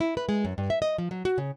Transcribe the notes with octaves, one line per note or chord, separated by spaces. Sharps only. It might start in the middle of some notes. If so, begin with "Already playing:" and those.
E4
B4
G#3
F#2
G2
E5
D#5
F3
F#3
F#4
C#3